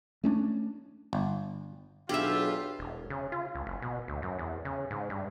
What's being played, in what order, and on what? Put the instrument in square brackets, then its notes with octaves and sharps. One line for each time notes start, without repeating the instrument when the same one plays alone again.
[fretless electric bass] A3 C#4 D4
[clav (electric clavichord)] G1
[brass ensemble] B1 E2 F4 [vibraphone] D4 G#4 E6 [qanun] G4 E5
[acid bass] E1
C#3
F4
C#2
F#1
B2
D2
F#2
E2
C#3
G#2
G2